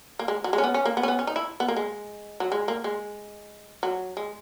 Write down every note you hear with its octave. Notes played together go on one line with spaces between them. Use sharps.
A#3
G#3
F#3
G#3
C#4
B3
C#4
A#3
B3
C#4
B3
C#4
D#4
E4
B3
A#3
G#3
F#3
G#3
A#3
G#3
F#3
G#3